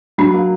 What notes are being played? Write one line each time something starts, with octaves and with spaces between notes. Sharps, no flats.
F#3 D4
A#3